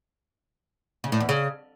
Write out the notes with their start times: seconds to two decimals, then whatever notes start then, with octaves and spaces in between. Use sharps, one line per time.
1.04 C#3
1.12 A2
1.20 E2
1.29 C#3